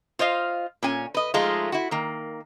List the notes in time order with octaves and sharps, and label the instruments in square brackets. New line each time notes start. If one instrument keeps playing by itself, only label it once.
[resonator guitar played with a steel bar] F4 C5 D#5 F5
A#2 C#4 G#5
B4 D#5
F3 G#3 A3 D#4 F4
E4 F#4
D#3 A#3